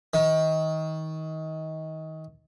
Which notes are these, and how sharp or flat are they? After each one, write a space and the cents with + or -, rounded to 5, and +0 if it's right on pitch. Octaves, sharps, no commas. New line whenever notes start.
D#3 +25